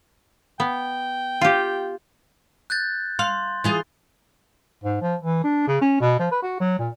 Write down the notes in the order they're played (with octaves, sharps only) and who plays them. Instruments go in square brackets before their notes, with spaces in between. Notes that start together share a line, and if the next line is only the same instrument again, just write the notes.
[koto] B3 [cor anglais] G5
[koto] F4 G4
[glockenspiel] F#6 G6 A6
[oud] F5 [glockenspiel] C6
[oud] E3 F4 G#4
[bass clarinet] G#2
F3
E3
D4
C#3
C#4
B2
F3
B4
F#4
F#3
A#2